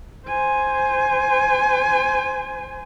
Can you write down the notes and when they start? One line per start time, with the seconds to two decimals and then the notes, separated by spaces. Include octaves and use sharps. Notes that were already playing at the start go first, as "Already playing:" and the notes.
0.28 C5 G#5